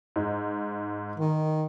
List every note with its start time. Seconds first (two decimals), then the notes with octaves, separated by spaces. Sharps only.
0.16 G#2
1.18 D#3